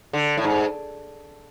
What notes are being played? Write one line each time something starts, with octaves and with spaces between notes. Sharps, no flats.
D3
A2
G#2